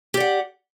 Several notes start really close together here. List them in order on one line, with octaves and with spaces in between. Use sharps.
G4 D5 F#5